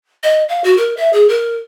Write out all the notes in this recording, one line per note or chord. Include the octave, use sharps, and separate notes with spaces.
D#5
F5
F#4
A#4
E5
G#4
A#4